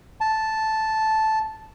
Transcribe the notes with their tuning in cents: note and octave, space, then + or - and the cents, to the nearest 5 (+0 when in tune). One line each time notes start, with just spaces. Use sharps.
A5 -5